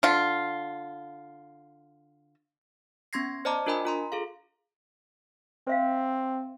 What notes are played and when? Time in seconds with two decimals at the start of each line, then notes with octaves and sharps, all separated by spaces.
0.03 D3 F4
3.13 B3 C#4 C6 G#6 A#6 C7
3.45 C5 D5 D#5 A5 A#5 D6
3.66 D4 F4 A#4 D#5 G#5 B5
3.85 F4 A#5 C6
4.12 G#4 A4 F5
5.67 C4 C5 E5 F5